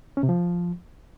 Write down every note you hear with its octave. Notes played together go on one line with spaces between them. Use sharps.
C#4
C3
F3